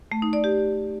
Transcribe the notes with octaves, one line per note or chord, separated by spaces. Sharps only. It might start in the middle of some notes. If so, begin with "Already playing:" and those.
A3
D#4
D5
G4